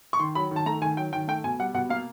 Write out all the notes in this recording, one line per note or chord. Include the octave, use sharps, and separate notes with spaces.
C#6
D#3 C6
F#3 B5
D#3 A5
A3 A#5
D#3 G#5
F#3 G5
D#3 G5
A3 G5
B2 G#5
G3 F#5
B2 F#5
A#3 F5